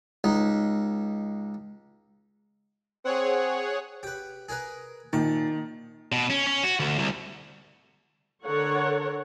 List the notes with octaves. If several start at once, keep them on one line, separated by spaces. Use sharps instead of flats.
C#2 D#4
C4 G#4 C#5 F#5
G4 B4
G#4 A#4 B4
A#1 D#3 A5
B2
C#4
C#4
F#4
D2
C2
D3 A4 A#4 C#5 F#5